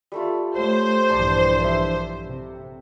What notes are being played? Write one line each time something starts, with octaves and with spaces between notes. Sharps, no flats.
G3 A3 F4
A3 C5 C#5 G5
A#1 G2 E3 D5 A5
E5 D6 D#6
C3